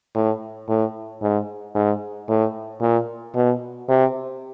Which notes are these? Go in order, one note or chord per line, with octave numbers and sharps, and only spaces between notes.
A2
A2
G#2
G#2
A2
A#2
B2
C3